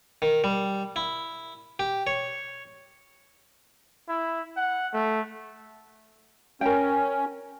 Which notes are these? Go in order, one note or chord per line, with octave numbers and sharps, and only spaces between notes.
D#3
G3
E4
G4
C#5
E4
F#5
A3
C#4 A#4 G5